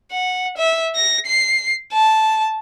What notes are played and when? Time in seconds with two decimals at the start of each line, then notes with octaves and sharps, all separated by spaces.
0.12 F#5
0.57 E5
0.95 A#6
1.26 C7
1.93 A5